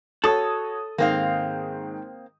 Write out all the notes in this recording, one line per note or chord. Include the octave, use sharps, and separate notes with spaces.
F#4 A4 C#5 D#6
G#2 D#3 A#3 C4 F5